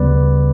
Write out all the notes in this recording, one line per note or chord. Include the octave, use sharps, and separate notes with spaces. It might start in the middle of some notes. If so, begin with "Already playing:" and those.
Already playing: D2 C#3 G3 B3 B4 D5